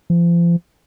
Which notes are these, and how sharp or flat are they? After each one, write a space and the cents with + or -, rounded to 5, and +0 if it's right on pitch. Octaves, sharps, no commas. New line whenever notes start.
F3 -35